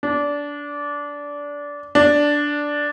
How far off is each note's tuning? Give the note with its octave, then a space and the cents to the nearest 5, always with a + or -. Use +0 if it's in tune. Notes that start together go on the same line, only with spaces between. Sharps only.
D4 -20
D4 -5